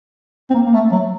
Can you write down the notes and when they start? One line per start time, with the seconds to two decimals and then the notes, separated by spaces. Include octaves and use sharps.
0.50 C4
0.54 A#3
0.66 A#3
0.74 A3
0.92 F#3